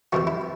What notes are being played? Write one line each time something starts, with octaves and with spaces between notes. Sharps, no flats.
F2 C3 E3 G3 F#4
E4